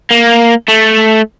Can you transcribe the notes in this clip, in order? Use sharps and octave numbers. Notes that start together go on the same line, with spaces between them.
A#3
A3